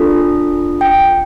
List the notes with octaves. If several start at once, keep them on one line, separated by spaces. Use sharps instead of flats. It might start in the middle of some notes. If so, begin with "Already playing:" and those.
Already playing: D4 F4 A4
G5